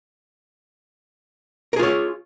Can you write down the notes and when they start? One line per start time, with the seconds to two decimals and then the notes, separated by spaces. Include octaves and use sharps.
1.73 A#4
1.76 G#4
1.79 F4
1.83 C#5